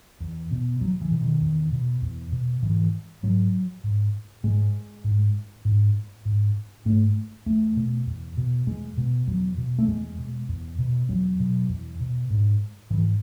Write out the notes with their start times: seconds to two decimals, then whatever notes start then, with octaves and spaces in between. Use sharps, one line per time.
0.20 E2
0.51 B2
0.81 E2 F#3
1.01 E3
1.11 B2
1.21 D#3
1.41 E2
1.72 B2
2.02 E2
2.32 B2
2.62 G#2 E3
3.23 G#2 F#3
3.84 G#2
4.43 G#2 G#3
5.04 G#2
5.65 G#2
6.25 G#2
6.85 G#2 A3
7.46 E2 A3
7.76 B2
8.06 E2
8.37 B2
8.67 E2 G#3
8.97 B2
9.27 E2 F#3
9.57 B2
9.78 A3
9.88 E2 G#3
10.18 B2
10.49 E2
10.78 B2
11.09 E2 F#3
11.39 B2
11.69 E2
12.00 B2
12.30 G#2
12.90 G#2 E3